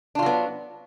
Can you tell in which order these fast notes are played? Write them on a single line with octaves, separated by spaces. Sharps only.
D4 F4 F#3 B3